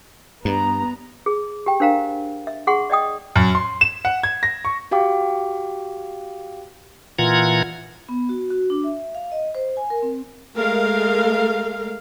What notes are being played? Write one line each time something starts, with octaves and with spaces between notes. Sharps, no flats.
G2 B3 A#5
G#4
G4 G5
D4 A#4 C5 F5 G5 A#5
E5
G#4 F#5 C6 C#6
D5 D#5 G5 D#6
F#2
C6
E7
F#5
G#6
A#6
C#6
F#4 G4 F5 G5 D6
A#2 E3 F4 F#5 A#5 G#6
B3
F#4
F#4
D4
E5
F5
D#5
C5
G#5
A#4
C4
G#3 A3 A#4 F5